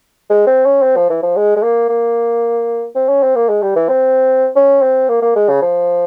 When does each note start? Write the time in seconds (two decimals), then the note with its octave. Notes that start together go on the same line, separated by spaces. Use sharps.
0.30 G#3
0.47 C4
0.66 C#4
0.82 C4
0.96 F3
1.10 E3
1.23 F3
1.36 G#3
1.57 G#3
1.63 A#3
1.89 A#3
2.96 C4
3.09 C#4
3.23 C4
3.36 A#3
3.49 G#3
3.63 G3
3.76 E3
3.89 C4
4.56 C#4
4.82 C4
5.09 A#3
5.22 A#3
5.36 G#3
5.49 C#3
5.62 F3